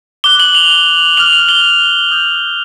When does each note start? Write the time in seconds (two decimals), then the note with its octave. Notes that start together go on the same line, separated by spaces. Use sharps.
0.24 D6 F#6 G7
0.40 F#7
0.55 F7
1.17 D6 F6 F7
1.33 F#7
1.49 G7
2.11 D#6 G6